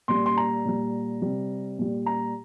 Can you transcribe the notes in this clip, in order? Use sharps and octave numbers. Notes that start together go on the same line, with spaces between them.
A#2 G3 C6
C6
A#5
A#2 G3
C3 G3
A#2 G3
A#5